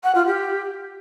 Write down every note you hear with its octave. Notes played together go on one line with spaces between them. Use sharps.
F#5
F4
G4